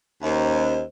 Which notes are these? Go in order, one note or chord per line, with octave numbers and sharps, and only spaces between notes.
D#2 C#4 C5 D#5